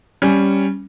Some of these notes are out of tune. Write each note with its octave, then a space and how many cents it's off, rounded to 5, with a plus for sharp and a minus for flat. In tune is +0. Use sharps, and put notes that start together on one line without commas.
G3 +0 C#4 +0